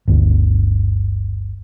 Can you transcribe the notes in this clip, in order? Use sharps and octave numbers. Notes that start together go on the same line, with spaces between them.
G1 D2